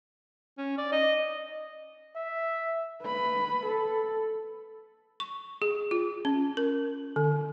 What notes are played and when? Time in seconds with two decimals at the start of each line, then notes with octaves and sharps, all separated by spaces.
0.58 C#4
0.78 D5
0.92 D#5
2.17 E5
3.02 B4 B5
3.66 A4
5.20 C#6
5.62 G#4
5.91 F4
6.25 C#4
6.57 A#4
7.16 D3